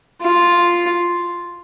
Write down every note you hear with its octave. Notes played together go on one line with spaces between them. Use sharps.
F4